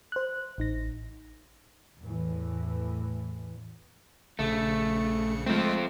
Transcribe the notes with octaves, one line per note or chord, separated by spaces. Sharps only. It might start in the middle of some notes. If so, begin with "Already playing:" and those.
C5 F#6
A1 D#4 A#6
E2 A2 E3
A#1 C#3 A3 C#7
F3 G#3 A3 C4